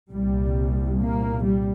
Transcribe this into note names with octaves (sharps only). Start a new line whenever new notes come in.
C2 A#2 G3
A#3
G3